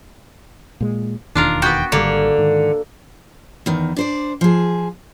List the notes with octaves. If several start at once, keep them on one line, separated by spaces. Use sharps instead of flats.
A#2 G#3
E1 D#2 D#3 D4 F4 A#4
B3 F#4 G5
G#1 D3 G3 A#3
G#2 D#3
E2 D#3
D4 C5 D5
F3 G#4